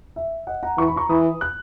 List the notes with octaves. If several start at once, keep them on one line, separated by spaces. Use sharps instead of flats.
E5
D#5 F#5
F#5 A#5
E3 C#6
B5
A#5 C#6
E3 B5 D#6
F#6